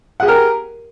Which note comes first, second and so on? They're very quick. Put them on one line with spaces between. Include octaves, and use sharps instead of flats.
F#5 G#4 G4 A#4